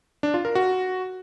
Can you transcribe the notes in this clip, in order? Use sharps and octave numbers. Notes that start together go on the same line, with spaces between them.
D4
F4
A#4
F#4